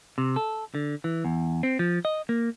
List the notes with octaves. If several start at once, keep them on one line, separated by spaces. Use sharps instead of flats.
C3
A4
D3
E3
E2
C4
F3
D#5
A#3